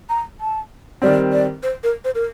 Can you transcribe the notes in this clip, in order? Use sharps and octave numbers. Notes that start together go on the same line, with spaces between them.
A#5
A5
D#3 G3 C4 D5
D5
C5
A#4
C5
A#4